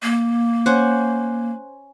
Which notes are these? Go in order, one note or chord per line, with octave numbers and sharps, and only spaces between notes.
A#3
C#4 C5 F#5